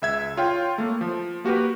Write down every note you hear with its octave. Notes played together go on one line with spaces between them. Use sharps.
C#2 E5 G#6
F4 C#5 F5 G5
A3 A#3
F3
A#3 F#4 G4 A#4 B4